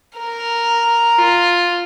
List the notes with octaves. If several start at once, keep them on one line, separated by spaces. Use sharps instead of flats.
A#4
F4